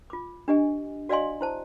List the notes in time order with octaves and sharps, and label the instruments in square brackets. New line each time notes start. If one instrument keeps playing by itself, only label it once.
[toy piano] F4 D6
D4 G4 D#5 G#5
F#4 D5 D#5 F5 G#5 C6
E4 C5 A5